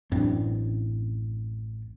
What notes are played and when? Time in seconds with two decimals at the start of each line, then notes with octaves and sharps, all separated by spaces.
0.12 A1 F#2 C4 D4